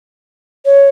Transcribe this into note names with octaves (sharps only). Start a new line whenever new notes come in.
C#5